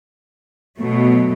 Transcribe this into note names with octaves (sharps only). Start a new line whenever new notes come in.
B2 F#3 A3